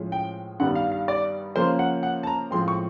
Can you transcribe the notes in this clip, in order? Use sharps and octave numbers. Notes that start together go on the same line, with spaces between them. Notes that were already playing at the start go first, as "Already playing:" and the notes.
Already playing: A2 F3 G#3 C#4
G5
G2 D#3 G3 B3 F#5
F5
F5
D5
C#3 F3 A#3 C#4 C5
F#5
F#5
A5
A#5
A2 F3 G#3 C4 C6
C#6